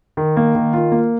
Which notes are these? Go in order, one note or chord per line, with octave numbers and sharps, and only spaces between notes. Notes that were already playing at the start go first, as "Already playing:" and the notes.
D#3
A#3
D#3
F4
A#3